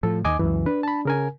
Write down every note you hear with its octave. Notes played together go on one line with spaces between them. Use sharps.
A2 F3 A4
D#2 D#3 D#5 G#5 D6
C#2 F#2 E3
D4 B4
A5 B5
C#3 A#4 G#5